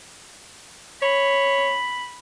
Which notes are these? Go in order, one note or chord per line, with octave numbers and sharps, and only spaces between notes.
C#5 B5